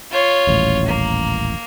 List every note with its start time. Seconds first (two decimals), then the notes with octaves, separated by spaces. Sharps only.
0.12 F4 C#5
0.47 D#1 A1
0.86 A#3